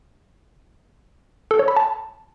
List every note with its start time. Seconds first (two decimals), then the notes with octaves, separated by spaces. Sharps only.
1.51 A4
1.59 C#5
1.68 B5
1.76 A5